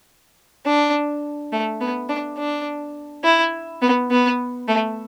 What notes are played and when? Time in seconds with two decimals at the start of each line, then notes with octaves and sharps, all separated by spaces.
0.66 D4
1.53 A3
1.81 B3
2.09 D4
2.38 D4
3.24 E4
3.82 B3
4.11 B3
4.68 A3